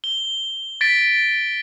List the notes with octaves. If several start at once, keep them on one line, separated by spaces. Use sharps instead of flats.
G7
A6 B6 D7